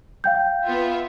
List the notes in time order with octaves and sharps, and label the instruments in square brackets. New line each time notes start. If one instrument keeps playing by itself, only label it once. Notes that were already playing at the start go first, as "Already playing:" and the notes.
[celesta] F5 G5 G6
[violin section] B3 F4 E5